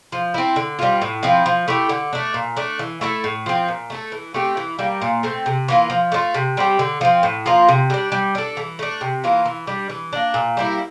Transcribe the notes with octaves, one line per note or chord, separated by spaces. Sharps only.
F3
C4 E4
D3
G3 C4 F4
A2
F3 C4 E4
F3
A3 E4 G4
D3
A3 D4
A#2
A3 D4
E3
A3 E4 A4
A2
F3 C4
A#2
A3 D4 A4
E3
A3 C4 G4
E3
G3 A#3
A#2
A3 C4
C3
E3 A#3 F4
F3
A3 D4 F4
C3
G3 C4 G4
D3
F3 C4
A2
F3 A#3 F4
C3
G3 D4
G3
D4 A4
E3
A3 D4
C3
E3 A#3 F4
E3
G3 D4
E3
A#3 D4
A#2
G3 A#3 E4